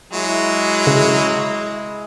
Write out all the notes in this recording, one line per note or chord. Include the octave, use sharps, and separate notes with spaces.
F#3 G#3 E4
C#3